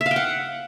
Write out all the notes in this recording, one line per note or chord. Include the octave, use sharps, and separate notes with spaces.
E5
F5
G5
F#5